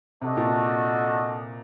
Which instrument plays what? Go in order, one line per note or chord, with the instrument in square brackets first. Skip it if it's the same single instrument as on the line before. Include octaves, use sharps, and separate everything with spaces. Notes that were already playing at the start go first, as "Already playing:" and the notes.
[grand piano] C3 [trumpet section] A3 D4 F#4 A4 D#5
[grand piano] A#2